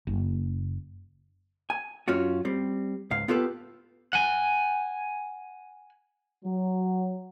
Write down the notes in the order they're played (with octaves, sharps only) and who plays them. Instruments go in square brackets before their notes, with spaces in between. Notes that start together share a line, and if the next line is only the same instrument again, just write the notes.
[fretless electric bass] F#1
[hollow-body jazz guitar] G#5
F#2 C#4 F4 F#4
G3 C4
C#2 G#2 F5
B3 F4 G4 A4 B4
[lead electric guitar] F#5 G#5
[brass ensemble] F#3